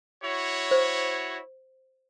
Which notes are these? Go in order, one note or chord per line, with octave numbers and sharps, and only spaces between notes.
E4 F#4 C#5
C5